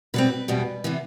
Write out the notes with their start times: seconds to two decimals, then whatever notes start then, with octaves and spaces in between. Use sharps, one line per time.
0.14 B2 G3 C4 B4
0.48 E2 B2 G3 B3
0.84 C3 E3 B3